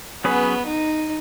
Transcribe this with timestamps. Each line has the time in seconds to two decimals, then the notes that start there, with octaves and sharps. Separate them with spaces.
0.24 F#3 B3 C#4 G#4 B4
0.66 D#4